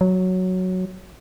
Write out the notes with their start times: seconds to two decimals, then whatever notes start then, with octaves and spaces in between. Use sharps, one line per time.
0.01 F#3